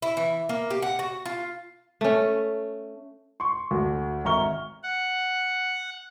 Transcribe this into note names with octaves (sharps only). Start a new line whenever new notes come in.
E4
E3
A#3
G4
F#5
F#4
F4
A3 C#4
C6 C#6
D2 F#4 A4
G#1 E5 A#5 C#6 F6 G7
F#5